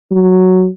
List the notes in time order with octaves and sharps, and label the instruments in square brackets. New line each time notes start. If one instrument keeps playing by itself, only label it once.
[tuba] F#3